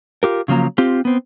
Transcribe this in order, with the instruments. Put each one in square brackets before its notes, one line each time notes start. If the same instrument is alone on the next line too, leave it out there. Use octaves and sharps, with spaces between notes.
[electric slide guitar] F4 G4 A#4
C#3 F3 F#3 A#3 A#5
C4 F4 G4
B3 C4